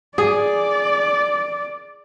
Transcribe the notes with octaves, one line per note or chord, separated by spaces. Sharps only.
G#4 D5